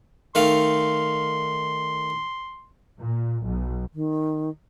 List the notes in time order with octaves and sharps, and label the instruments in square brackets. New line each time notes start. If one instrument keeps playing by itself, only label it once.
[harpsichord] D#3 A3 F5 [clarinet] C6
[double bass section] A#2
B1
[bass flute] D#3